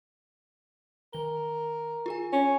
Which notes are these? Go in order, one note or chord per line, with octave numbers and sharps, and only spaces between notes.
D#3 A#4 G7
F4 G#4 G#5
C#4